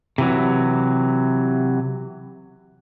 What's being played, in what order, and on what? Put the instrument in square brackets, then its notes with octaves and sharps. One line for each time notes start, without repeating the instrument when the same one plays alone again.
[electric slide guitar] C3 E3 F#3